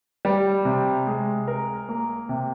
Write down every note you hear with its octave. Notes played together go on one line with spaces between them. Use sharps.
G3
C3
G#3
A#4
A#3
C3